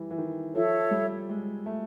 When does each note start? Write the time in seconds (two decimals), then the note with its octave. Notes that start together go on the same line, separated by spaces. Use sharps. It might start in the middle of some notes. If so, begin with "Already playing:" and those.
Already playing: E3 G3
0.10 E3
0.18 D#3
0.54 F3 A4 C#5 E5
0.91 G3
1.29 G#3
1.66 A3